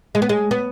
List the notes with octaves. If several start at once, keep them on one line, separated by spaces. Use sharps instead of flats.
G#3
B3
G#3
B3